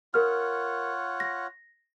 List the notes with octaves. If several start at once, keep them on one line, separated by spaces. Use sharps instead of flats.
F4 A#4 C#5 F#5 F6
A#6